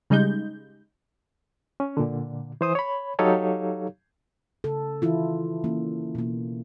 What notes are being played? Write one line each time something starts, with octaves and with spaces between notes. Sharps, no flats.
C#3 G3 G#3 D#4 G6
C#4
A#2 D3
E3 C5 D#6
C#5 B5
F#3 D#4 G4 A4 C#5 F5
C#3 A4
D#3 E3 E4 F4
E3 A#3 C#4
B2 A#3